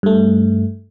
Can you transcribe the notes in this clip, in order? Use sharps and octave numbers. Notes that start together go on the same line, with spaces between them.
G2 A3